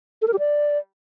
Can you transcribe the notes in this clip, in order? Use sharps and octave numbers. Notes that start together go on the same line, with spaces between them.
A4
A#4
G4
D5